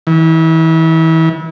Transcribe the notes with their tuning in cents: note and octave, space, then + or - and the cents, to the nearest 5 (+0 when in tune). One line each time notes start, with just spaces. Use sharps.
E3 -35